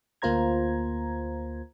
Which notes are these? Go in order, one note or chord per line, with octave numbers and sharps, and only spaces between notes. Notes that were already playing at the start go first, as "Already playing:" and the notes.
D2 A#3 F4 C5 A#5 G#6